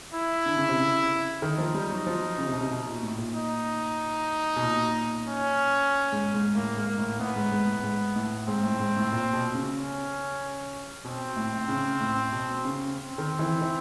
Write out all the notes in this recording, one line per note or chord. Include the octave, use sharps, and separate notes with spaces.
E4
D3
C#3
C3
C#3
D#3 D#4
F3
G3
F#3
F3
C#3
C3
B2
C3
B2
A#2
A2
A#2
D#4
B2
A#2
C#4
G#2
G#2
A2 A#3
G#2
A#3
A2
A2 B3
G#2
G#2
A2
G#2
A2
G#2 C4
A2
G#2
A2
A#2
B2
C#3
C#4
B2 C4
A2
A2
C#3
A2
B2
C#3
C4
D#3
E3
E3